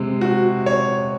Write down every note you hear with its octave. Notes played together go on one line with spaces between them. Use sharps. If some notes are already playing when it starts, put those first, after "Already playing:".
Already playing: C3 G#3
F#4
C#5